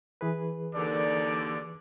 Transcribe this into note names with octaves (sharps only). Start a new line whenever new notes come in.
E3 G#4 B4
D#2 D3 D5